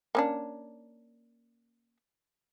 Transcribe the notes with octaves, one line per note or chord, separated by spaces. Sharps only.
A#3 C#4 D4